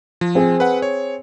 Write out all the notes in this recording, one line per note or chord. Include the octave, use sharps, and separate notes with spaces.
F3
C4 G#4
B4 F#5
C#5